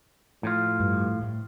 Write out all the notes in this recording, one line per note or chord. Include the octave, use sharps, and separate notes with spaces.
A2 F3 F4
G2
A2